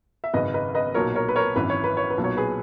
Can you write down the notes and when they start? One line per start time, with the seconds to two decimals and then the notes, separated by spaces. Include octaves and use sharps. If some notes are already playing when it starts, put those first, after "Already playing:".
0.24 E5
0.33 G#1 F#2 C#3 B4 D#5
0.54 B4 D#5
0.75 B4 D#5
0.94 B1 A#2 F#3 A#4 C#5
1.16 A#4 C#5
1.29 B4
1.36 A#4 C#5
1.56 G#1 F#2 E3 B4
1.70 C#5
1.84 B4
1.97 C#5
2.10 B4
2.18 B1 A#2 F#3
2.24 C#5
2.37 G#4 B4